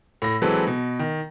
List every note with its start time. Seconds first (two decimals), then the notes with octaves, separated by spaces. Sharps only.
0.22 A2 A#6
0.42 E3 F#3 G#3 C4 A4 B4
0.67 B2
0.99 D#3